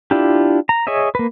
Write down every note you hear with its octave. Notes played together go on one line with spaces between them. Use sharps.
D4 E4 F4 G4
A#5
G#4 C#5 D#5 E5
A#3 B4